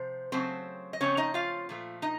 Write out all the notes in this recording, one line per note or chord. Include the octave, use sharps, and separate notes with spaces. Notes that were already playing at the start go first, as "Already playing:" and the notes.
Already playing: C3 F3 C5
C#3 F#3 A3 C4 C5
D#5
C#3 F3 A3 C4 C#4 C#5
D#4 D#5
F4 F5
A#2 F3 A3
D#4 D#5